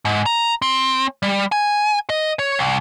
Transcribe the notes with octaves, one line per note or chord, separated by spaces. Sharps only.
G#2
A#5
C4
G3
G#5
D#5
C#5
C2